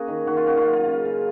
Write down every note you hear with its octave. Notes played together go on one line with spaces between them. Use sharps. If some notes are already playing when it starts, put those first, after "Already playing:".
Already playing: A#3 C#4 F#4 G#4
D#3
D#3 F#4
F4
C#4 F#4
F4
F#3
F4
C#3
C#3